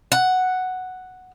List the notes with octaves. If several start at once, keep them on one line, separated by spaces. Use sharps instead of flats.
F#5